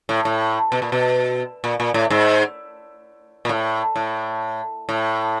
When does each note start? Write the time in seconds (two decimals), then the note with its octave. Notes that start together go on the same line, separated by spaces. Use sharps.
0.09 A2
0.25 A2
0.72 B2
0.82 A#2
0.92 B2
1.64 A#2
1.80 A#2
1.94 A2
2.10 G#2
3.45 A#2
3.49 A2
3.96 A2
4.89 A2